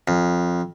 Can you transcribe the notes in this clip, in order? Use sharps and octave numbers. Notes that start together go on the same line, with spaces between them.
F2